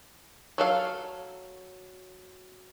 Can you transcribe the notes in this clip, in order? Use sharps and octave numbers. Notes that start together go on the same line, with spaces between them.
F#3 A4 F5